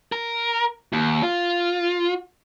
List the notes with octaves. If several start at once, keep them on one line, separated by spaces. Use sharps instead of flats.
A#4
D#2
F4